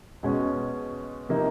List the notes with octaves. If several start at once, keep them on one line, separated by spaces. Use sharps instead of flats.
B2 G#3 C#4
C3 F3 A#3 D#4